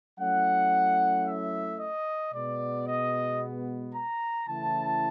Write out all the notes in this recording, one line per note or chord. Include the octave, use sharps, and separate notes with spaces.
F#3 A3 C#4 E4 F#5
E5
D#5
B2 G#3 B3 D5
D#5
A#5
C#3 E3 A3 C#4 E4 A5